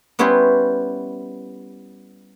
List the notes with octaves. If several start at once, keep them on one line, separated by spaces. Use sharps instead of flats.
G3 B3 C#4 E4 B4 C5